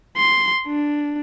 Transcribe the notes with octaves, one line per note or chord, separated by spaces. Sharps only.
C6
D4